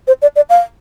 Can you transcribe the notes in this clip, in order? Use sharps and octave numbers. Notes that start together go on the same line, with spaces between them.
C5
D5
D5
F5